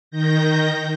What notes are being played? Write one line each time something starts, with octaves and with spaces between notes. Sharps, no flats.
D#3 G6 A#6